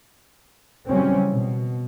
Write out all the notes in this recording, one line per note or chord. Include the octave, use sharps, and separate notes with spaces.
C#3 E3 F#3 G3 C4 C#4
B2